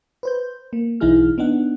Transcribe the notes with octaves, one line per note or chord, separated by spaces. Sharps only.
B4 C5 G6
A#3
B1 E3 D#4 E4 G#4 F6
B3 D4 D#4 F#5